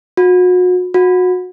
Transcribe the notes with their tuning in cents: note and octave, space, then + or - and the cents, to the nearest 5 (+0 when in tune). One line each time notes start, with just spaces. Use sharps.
F#4 -35
F#4 -25